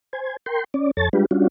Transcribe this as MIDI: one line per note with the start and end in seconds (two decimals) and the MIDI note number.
0.13 0.36 72
0.13 0.36 80
0.46 0.64 70
0.46 0.64 79
0.46 0.64 84
0.74 0.91 61
0.74 0.91 74
0.97 1.09 41
0.97 1.09 69
0.97 1.09 73
0.97 1.09 81
0.97 1.09 93
1.13 1.26 55
1.13 1.26 56
1.13 1.26 62
1.13 1.26 65
1.13 1.26 67
1.13 1.26 71
1.31 1.48 55
1.31 1.48 61
1.31 1.48 62
1.31 1.48 65
1.31 1.48 66